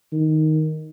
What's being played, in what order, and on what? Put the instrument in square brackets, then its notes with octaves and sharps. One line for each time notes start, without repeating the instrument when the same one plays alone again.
[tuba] D#3